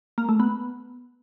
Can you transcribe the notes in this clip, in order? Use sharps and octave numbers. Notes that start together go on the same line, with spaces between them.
A#3
A3
B3